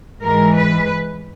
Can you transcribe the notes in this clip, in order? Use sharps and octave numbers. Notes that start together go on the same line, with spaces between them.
G#2 E3 G#3 A#4
B4